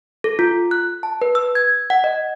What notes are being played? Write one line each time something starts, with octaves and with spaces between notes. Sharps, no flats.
A4
F4
F#6
A5
B4
E6
G#6
F#5
D#5